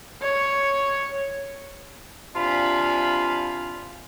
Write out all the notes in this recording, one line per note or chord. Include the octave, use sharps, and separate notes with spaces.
C#5
C3 D4 F4 F5 G#5 B5